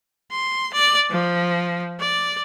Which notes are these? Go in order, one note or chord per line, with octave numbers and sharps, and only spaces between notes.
C6
D5
F3
D5